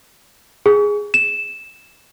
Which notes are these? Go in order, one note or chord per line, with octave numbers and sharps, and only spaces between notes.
G#4
E7